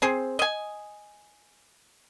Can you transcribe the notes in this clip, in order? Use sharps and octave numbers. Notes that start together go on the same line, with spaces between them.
C4 G#4 C5
D#5 G#5